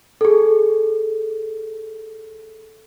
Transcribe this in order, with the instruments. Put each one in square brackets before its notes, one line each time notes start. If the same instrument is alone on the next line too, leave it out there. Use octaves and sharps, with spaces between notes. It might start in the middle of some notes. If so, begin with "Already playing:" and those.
[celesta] G#4 A4